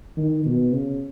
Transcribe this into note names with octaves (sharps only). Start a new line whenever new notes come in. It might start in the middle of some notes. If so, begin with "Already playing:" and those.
D#3
B2
C#3